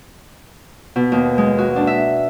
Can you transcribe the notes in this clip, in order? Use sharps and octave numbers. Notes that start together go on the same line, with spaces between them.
B2
D#2
G#3
F#4
D4
E5